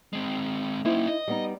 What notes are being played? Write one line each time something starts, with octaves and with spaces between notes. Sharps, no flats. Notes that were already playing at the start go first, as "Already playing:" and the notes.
G#3 C4
A#3 C#4 D#4 E4 C5
D#5
G3 B3 D#4